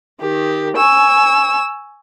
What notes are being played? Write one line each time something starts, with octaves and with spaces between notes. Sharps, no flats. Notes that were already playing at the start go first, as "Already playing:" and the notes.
D#3 G4
G#5 C#6 E6